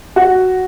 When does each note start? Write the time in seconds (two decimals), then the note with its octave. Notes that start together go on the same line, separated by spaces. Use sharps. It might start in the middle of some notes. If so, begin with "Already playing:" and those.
0.16 F#4